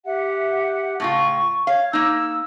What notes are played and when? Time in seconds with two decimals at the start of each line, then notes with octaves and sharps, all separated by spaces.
0.05 G4 E5 F#5
1.00 A2 C#3 F4 C#6
1.67 C#5 F5
1.93 A#3 D#4 E6